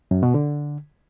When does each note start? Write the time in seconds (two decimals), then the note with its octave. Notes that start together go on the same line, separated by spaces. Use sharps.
0.11 F#2
0.23 B2
0.34 D3